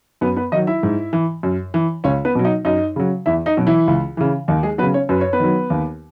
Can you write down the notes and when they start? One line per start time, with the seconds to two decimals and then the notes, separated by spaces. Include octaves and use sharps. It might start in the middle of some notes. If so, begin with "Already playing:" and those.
0.21 F#2 B3 B4
0.36 B3 B4
0.52 D#3 D#4 D#5
0.56 F#3
0.67 E4 E5
0.83 G#2
1.13 E3
1.43 F#2
1.74 E3
2.04 C#2 C#4 C#5
2.25 B3 B4
2.35 B2 F#3
2.45 D#4 D#5
2.65 F#2 D#4 D#5
2.96 C#3 F#3
3.26 E2 E4 E5
3.46 D#4 D#5
3.57 B2 F#3
3.67 E3 E4
3.88 C#2
4.17 C#3 E3
4.48 D#2 D#3 D#4
4.63 G#3 G#4
4.78 F#3 B3 B4
4.83 C#3
4.94 C#4 C#5
5.09 F#2 B4
5.21 C#5
5.33 B3 B4
5.40 D#3 F#3
5.70 D#2